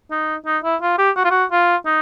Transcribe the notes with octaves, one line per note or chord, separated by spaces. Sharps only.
D#4
D#4
E4
F4
G4
F#4
F4
F#4
F4
D#4